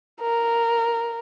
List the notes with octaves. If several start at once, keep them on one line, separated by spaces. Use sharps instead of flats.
A#4